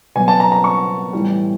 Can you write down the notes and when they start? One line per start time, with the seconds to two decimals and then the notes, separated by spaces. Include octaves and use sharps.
0.15 B2 F#3 G#5
0.28 A5
0.40 A#5
0.52 A#5
0.64 C#6
1.13 A2 E3 G3